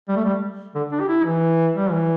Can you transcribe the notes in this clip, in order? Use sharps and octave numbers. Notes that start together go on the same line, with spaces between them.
G3
A3
G3
D3
D4
G4
E4
E3
G3
E3